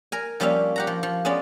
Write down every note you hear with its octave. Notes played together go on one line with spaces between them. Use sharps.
A#4 G#5
F3 G3 A#3 C#4 E5 F5
G4 F#5 A#5
F3
F3
G#3 B3 C#4 D5 B5